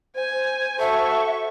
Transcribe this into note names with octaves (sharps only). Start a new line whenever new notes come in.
C5 G#5
F#4 A4 E5 C#6